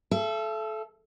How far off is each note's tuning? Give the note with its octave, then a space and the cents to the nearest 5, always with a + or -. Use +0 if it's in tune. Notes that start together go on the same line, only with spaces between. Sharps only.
A4 -25 E5 +35